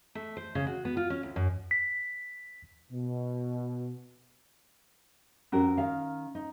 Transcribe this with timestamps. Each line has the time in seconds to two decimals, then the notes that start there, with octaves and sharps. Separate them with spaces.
0.15 A3
0.37 C5
0.55 C#3
0.67 F#4
0.85 B3
0.97 F4
1.10 C#4
1.23 D2
1.36 F#2
1.71 B6
2.91 B2
5.52 F2 C#4 F#4 A#4 A#5
5.77 D#3 F5
6.35 D#4